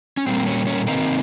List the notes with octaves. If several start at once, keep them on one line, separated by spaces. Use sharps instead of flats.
C#4
A#2 G3 A#3 C4
C#4
C#4
C3 D#3 A#3 C4 D#4